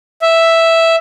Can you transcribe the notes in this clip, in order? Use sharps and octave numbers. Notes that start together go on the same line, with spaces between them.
E5